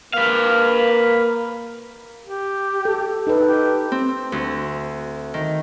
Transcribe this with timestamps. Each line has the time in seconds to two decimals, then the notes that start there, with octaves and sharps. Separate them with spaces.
0.13 A#3 B4 F5
2.25 G4
2.85 A4
3.27 D#4 A4 B4
3.43 G4
3.92 C4
4.32 D2
5.34 D#3